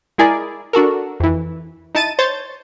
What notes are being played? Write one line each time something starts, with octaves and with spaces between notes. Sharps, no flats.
G#3 E4 G#4 A#4 D5
D4 F#4 A4 A#4
F2 E3
D#4 E4 A5 A6 D#7
C5 C#5 G6 A6